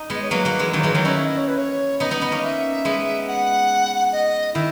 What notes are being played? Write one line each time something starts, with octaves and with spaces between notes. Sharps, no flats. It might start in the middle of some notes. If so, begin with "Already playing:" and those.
Already playing: D#4
G#3 B3
D#5
C#5
F#3 A#3 B4
F#3 A#3
E3 G#3
D#3 F#3
C#5
E3 G#3 B4
D#3 F#3 C#5
C#4 E4 D#5
E5
D#5
C#5
B4
C#5
B3 D#4 D#5
B3 D#4
B3 D#4
A#3 C#4
E5
G#3 B3
F#5
D#5
D#3 E4